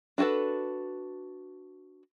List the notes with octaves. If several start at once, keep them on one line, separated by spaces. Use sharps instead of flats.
D4 F#4 G#4 A4 B4